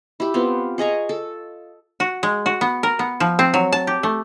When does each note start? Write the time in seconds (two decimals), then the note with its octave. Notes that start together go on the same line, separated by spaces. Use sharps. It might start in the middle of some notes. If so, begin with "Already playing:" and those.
0.20 E4 G4
0.34 B3 C4 F4
0.78 G#4 D#5 A#5 C#6
1.09 A4
2.00 F#4
2.23 G#3
2.46 F#4
2.61 B3
2.83 A#4
2.99 B3
3.20 F3
3.39 C4
3.54 F#3
3.72 A5
3.87 G4
4.03 A3